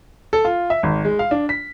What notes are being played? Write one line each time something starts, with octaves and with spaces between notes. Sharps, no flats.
A4
F4
E5
G#1
G#3
F5
D4
B6